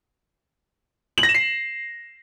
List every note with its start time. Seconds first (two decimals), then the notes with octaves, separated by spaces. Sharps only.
1.18 F#7
1.23 A#6
1.29 E7
1.34 C7